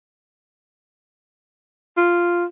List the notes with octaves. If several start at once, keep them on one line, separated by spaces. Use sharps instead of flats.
F4